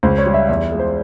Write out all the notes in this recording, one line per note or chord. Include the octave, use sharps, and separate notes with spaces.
C#2 C5
C#5
G3
E5
E2 E5
G#3
C5